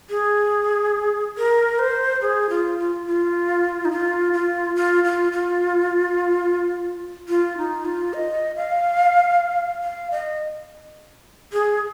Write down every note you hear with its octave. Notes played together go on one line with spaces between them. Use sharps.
G#4
A#4
C5
G#4
F4
F4
F4
D#4
F4
F4
F4
F4
F4
F4
D#4
F4
D#5
F5
F5
D#5
G#4